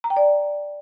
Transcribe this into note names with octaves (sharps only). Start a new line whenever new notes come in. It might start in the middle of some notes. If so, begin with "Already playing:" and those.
A#5
G5
D5